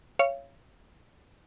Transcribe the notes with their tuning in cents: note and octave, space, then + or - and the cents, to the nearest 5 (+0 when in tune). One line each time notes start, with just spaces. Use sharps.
C#5 +0 F5 -30